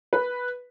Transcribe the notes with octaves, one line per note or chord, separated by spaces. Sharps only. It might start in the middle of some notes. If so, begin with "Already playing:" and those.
B4